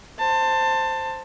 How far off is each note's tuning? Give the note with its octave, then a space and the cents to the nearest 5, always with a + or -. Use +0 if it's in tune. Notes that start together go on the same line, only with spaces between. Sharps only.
C5 +0 A5 +20